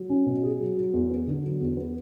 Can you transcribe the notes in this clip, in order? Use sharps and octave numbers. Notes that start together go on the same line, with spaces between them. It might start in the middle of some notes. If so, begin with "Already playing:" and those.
Already playing: F#3
C#4
B2
G#4
F#3
F#3
E2
B3
D3
F#3
E2
B3